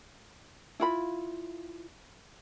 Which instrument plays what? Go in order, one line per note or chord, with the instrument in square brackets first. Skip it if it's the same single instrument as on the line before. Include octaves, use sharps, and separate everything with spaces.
[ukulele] E4 F4 B5